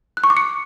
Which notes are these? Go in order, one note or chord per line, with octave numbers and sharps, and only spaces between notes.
F#6
C#6
D6
C#7